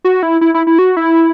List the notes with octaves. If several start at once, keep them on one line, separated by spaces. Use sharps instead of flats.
F#4
E4
E4
E4
E4
F#4
E4